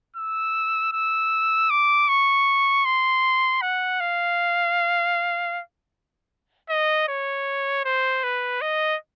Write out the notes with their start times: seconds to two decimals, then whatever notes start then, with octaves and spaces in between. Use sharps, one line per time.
0.16 E6
0.93 E6
1.70 D6
2.08 C#6
2.85 C6
3.62 F#5
4.00 F5
6.70 D#5
7.08 C#5
7.85 C5
8.23 B4
8.61 D#5